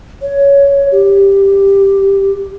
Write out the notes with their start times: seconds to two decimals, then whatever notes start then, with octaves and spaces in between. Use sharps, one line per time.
0.22 C#5
0.92 G4